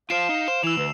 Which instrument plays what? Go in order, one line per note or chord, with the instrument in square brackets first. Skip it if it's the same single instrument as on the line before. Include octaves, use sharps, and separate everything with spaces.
[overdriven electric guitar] F4 C5 [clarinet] F5 [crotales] C7 D7 E7
[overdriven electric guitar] D#4
[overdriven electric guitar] C5 [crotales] E7
[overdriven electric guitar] E3 [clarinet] E4 [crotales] E6 E7 F7
[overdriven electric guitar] D2 [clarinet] B4